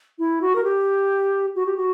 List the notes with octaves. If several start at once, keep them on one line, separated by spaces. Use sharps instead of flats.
E4
F#4
A#4
G4
F#4
G4
F#4